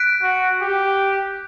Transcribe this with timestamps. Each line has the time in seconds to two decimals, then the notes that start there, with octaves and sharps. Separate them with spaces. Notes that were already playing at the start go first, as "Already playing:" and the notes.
Already playing: F#6 B6 D7
0.22 F#4
0.61 G4